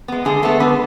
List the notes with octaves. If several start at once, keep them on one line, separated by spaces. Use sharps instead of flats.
G#3 B3
D3 G#3 G#4
G#3 A3 B3 A4
D3 B3 B4